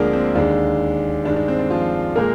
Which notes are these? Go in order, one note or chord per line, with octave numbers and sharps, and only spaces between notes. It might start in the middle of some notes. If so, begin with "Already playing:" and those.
Already playing: D2 D3 F3 G#3 A#3 D4 G#4 A#4
C4
D#2 D3 G#3 D4
G2 D#3 G#3 D4
D4
C4
D4
F3 F4
A#2 G#3 A#3 A#4